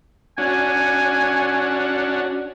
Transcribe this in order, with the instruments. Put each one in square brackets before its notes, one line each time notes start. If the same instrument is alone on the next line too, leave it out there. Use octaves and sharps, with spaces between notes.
[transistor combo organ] C#4 D4 F#4 [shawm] G#5